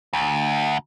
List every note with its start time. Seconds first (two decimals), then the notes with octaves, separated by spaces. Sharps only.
0.13 D2